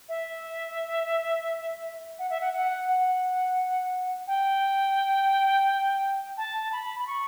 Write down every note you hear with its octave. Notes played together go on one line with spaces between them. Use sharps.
E5
F#5
E5
F#5
F#5
F#5
G5
A5
B5
B5
C#6